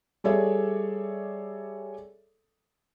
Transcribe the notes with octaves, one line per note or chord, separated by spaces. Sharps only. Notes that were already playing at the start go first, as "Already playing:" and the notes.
G3 G#4 A4 C#5 D5 E5